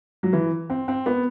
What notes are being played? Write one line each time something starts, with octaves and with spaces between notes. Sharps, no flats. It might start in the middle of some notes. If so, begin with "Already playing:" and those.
F#3
E3
C4
C4
B3